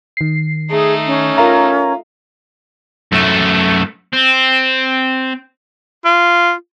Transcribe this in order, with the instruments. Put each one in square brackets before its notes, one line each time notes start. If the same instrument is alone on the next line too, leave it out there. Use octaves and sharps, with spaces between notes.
[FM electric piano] D#3 C7
[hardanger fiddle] A3 D#4 [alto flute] G#4
[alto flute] C#4
[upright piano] F4 [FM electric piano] A#4 A#5
[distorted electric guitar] F#2 A3
C4
[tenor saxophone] F4